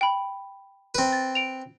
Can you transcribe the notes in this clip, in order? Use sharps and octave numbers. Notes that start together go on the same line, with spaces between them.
G5 B5
C4 B4
A6
D7 F7